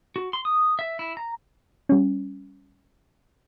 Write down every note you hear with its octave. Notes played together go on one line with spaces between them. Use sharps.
F#4
C6
D#6
E5
E4
A#5
G3 C#4